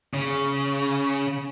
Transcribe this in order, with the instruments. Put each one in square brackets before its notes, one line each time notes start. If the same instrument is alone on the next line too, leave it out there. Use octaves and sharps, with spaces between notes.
[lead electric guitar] C#3